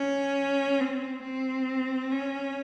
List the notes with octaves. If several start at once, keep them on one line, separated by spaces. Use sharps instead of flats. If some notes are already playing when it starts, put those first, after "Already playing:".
Already playing: C#4
C4
C4
C#4